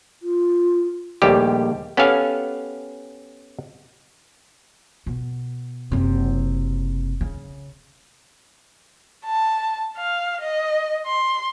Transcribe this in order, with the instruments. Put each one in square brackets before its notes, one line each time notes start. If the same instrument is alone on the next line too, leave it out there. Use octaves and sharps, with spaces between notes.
[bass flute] F4
[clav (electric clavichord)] A#1 D#2 G3 A3 G4
B3 C#4 G4 A4 F5 G#5
[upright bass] B2
F#1 C3
C#3
[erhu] A5
F5
D#5
C6